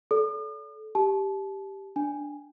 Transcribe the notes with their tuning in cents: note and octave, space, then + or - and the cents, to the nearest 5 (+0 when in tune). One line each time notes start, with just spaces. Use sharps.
A4 -20 D5 -40 D#6 -45
G4 +0 A5 -30
D4 +0 G#5 +0